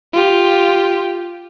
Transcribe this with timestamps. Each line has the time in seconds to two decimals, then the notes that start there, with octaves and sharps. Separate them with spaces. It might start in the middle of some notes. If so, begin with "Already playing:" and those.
0.13 F4 G4